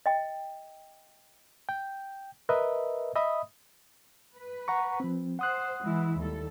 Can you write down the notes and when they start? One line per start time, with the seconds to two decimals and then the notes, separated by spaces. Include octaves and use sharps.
0.06 D#5 G5
1.69 G5
2.49 A#4 B4 D#5 E5
3.16 D#5 E5 B5 D#6
4.37 B4
4.68 F#5 A#5 C#6
5.00 F3 C4
5.39 C5 F#5 D#6 F#6
5.82 E3 G#3 E4
6.17 D#2 G3 A4